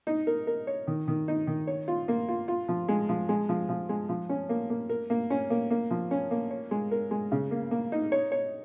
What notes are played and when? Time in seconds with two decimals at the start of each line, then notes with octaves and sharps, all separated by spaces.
0.07 D#4
0.27 A#4
0.47 A#4
0.67 C#5
0.87 D#3
1.08 D#3
1.28 D#4
1.47 D#3
1.67 C#5
1.88 F4
2.08 A#3
2.29 F4
2.48 F4
2.68 F3
2.88 G#3
3.09 F3
3.29 G#3
3.49 F3
3.69 F3
3.89 G#3
4.09 F3
4.29 C#4
4.49 A#3
4.70 A#3
4.89 A#4
5.10 A#3
5.30 C#4
5.50 A#3
5.70 A#3
5.91 F3
6.11 C#4
6.31 A#3
6.50 C#5
6.71 G#3
6.91 A#4
7.11 G#3
7.32 C#3
7.51 A#3
7.71 A#3
7.92 D#4
8.12 C#5
8.32 C#5